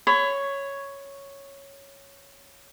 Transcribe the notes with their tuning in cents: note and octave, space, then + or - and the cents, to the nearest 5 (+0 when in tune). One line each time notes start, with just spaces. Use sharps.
C#5 +0 B5 +30